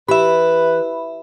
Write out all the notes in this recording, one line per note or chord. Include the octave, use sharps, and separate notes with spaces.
E3 G4 B4 E5 B5